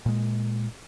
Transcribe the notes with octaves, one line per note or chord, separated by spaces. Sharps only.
A#2 G#3